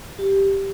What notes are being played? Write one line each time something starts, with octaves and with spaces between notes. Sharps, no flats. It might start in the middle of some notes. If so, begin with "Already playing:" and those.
G4